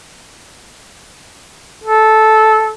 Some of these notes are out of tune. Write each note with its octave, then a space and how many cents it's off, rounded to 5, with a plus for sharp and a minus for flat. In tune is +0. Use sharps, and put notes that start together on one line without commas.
A4 -10